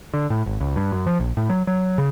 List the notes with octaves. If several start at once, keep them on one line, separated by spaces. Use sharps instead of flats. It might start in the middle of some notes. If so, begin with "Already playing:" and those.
D3
A2
G#1
C#2
G2
F#2
F3
A#1
A2
F#3
F#3
C#3